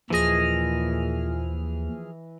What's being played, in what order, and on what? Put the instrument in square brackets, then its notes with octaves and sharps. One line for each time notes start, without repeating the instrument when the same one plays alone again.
[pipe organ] D#2 [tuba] A#2 [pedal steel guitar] E3 D#5 [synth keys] F3 G#4 F6